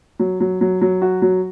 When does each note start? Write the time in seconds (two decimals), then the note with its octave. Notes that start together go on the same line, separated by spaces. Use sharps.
0.20 F#3
0.40 F#3
0.61 F#3
0.82 F#3
1.02 F#4
1.22 F#3